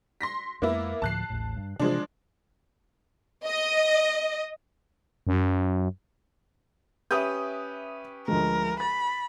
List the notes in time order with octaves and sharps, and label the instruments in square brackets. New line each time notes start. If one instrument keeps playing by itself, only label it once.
[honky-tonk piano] C6 A#6 B6
[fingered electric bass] F2 G#3 [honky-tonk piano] A#3 B3 E4
[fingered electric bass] D2 A2 F3 [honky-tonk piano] A5 F#6 C7
[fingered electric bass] A1 D#2 A2
G2
[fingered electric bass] C3 E3 [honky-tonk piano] F3 G#3 D4
[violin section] D#5
[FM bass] F#2
[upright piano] C#4 G4 B4 [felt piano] E5 D#6 G6
[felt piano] D2 F3 G#3 [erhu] A#4
[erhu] B5 [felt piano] A6